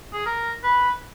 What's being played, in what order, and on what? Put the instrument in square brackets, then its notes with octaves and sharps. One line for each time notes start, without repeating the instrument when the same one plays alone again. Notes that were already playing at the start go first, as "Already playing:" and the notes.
[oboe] G#4
A#4
B4